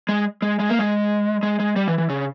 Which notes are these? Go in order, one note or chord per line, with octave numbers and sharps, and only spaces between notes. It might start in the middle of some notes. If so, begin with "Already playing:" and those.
G#3
G#3
G#3
A#3
G#3
G#3
G#3
G3
E3
E3
C#3